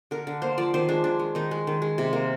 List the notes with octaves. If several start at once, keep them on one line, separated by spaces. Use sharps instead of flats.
D3 A#4
D3
A#3 C5
F3 D5
D#3 C5
G#3 D4
D#3 D4
G#3
D#3 D#4
G#3
D#3
G#3
C3
A#3